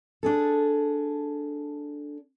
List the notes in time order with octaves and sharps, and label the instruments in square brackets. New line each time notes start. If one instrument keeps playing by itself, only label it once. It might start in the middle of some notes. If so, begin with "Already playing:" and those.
[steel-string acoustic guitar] D4 G#4 A4